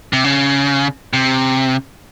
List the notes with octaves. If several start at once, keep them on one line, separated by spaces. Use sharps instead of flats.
C3
C#3
C3